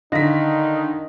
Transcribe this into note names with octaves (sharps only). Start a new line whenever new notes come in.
D3 D#3 D#4 D#5 F5 A#6 B6